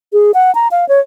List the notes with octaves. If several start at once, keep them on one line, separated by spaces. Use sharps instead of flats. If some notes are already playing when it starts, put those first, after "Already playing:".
G#4
F#5
A#5
F5
C#5